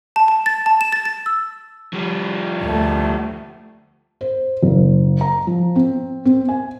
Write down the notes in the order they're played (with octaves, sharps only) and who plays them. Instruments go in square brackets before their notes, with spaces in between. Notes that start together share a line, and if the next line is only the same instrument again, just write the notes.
[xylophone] A5
A5
A6
A5
E7
A6
A6
E6
[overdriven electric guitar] F3 G3
[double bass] D2 A3
[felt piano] C5
F#1
A#5
F3
C4
C4
G#5